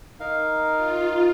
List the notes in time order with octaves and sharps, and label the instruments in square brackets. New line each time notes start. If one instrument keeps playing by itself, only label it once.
[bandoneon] D#4 A#4 F5
[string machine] F4